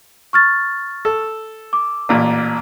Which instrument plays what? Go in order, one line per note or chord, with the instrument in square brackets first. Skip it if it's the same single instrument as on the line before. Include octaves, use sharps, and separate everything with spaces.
[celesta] C#6 F6 A6
[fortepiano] A4
[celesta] D6
[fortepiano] A1 A#2